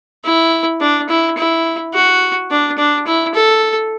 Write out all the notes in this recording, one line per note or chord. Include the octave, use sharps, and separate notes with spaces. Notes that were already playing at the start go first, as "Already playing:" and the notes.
E4
D4
E4
E4
F#4
D4
D4
E4
A4